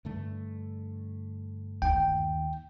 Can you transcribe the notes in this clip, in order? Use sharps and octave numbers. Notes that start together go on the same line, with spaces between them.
G2 D3 A3
D#2 G5